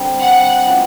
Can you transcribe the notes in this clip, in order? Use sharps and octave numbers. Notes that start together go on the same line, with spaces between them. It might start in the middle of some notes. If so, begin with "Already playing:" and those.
Already playing: D3 G3 C4
F#5
E3 A3 C#4 F4